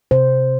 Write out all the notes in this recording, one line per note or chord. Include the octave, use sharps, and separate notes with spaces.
C3 C5